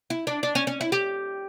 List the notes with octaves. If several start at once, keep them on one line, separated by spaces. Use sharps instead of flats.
E4
D4
D4
C#4
C#4
E4
G4